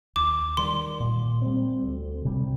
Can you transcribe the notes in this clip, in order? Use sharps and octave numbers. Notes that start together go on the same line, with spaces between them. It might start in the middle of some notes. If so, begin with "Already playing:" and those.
D#2 D6
D#3 G3 C6
A#2
G3 C4
D2
C3 G3